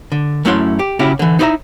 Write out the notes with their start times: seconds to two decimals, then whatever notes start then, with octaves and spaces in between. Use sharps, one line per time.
0.12 D3
0.45 F#2 A3 C#4 E4 F#5 C6
0.79 G4
0.99 C#3 C#4 E4 F#4 G4
1.19 D3 E3
1.39 D#4 E4 B4 D5 E5 A#5